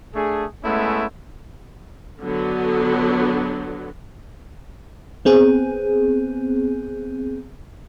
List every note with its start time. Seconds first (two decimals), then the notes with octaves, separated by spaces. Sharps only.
0.15 A3 D4 G#4
0.64 G#3 A3 B3 C#4 E4
2.20 D3 F#3 B3
5.25 B3 C4 G#4